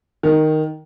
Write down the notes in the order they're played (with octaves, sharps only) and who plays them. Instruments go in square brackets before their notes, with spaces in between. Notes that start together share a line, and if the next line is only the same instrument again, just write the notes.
[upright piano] D#3